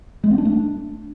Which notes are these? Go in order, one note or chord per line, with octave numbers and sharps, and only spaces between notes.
G#3
C4
D4
A3
D4